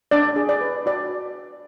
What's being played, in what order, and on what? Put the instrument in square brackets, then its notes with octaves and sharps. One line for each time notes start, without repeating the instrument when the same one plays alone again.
[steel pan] D4 D5
G#4
D5
B4
F#4 D5